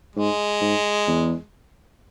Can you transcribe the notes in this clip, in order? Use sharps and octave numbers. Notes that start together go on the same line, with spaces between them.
G#2 G#3
G#2
E2